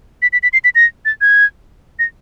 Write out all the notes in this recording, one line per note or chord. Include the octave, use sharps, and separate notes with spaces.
B6
B6
B6
C7
B6
A#6
A6
G#6
A#6